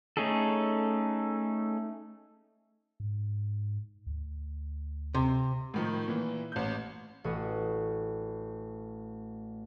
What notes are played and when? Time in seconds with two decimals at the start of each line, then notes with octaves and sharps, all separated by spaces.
0.17 A3 C#4 D#4 G#4 A4
3.00 G#2
4.07 D2
5.14 C3
5.74 A2 D#3 F3
6.08 A#2 E3
6.52 A1 G6
7.24 A1 F#4 D#6